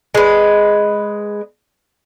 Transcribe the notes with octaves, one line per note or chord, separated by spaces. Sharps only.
G#3 B4